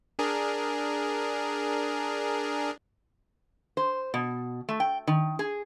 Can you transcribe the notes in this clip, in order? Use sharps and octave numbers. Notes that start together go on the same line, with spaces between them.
D4 G#4 A#4
C5
B2
A3
G5
D#3
G#4